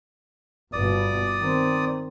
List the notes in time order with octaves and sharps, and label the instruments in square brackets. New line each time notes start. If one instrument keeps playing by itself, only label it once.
[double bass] G1 B2 [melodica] D5 D#6
[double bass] D#3 C4